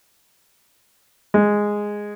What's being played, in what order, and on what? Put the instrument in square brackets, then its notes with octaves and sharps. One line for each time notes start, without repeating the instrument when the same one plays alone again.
[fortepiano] G#3